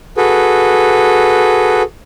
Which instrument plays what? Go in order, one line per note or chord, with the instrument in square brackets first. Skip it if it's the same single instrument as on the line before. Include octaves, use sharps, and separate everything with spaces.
[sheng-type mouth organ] F#4 G#4 A4 B4